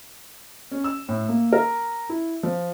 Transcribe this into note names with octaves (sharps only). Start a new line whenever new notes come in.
C#4
E6
A2
A#3
A#4
E4
F3